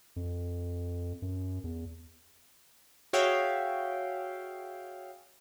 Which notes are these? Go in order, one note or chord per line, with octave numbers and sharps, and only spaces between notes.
F2
F#2
E2
F#4 G#4 C#5 E5 F5 G5